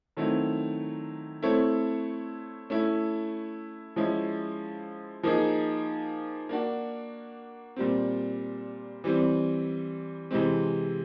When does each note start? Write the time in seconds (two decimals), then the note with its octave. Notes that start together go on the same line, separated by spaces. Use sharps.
0.17 D#3 F#3 A3 C4 E4
1.42 A3 C4 E4 A4 C#5
2.70 A3 C#4 E4
3.96 F3 G#3 C#4 E4
5.23 F3 A#3 D#4 G#4
6.49 A#3 D4 F#4
7.76 A#2 G3 C4
9.04 E3 G3 C4
10.31 C3 E3 G#3 C4